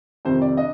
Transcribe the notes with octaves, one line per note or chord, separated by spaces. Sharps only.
F2 C3 D#3 G3 C4 C5
D5
D4 D#5